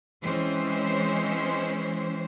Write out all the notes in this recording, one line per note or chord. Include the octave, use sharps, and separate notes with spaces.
E3 G#3 C4 C#4 C5